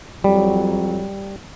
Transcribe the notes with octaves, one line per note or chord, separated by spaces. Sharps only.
F2 F#3 G3